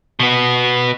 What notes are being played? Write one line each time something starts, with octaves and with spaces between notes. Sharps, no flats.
B2 B3